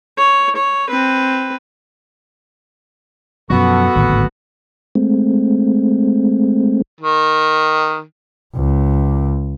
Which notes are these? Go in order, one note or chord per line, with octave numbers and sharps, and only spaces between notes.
C#5
C#5
C4 B4
F#2 B2 F3 B3 F#4 A4
D1 G#1 D2
G#3 A3 C4
D#3
C#2